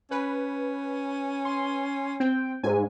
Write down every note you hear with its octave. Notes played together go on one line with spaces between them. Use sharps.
C#4 B4
C6
C4 G5
G#2 G#5